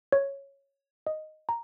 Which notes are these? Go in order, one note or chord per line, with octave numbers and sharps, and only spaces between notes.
C#5
D#5
A#5